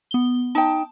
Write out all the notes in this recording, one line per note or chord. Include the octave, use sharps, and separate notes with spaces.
B3 G7
D#4 G5 A5